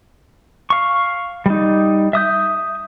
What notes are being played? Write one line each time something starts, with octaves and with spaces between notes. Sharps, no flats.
F5 C#6
G3 D#4
E5 D#6 G6